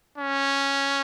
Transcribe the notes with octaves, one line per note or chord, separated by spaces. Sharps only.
C#4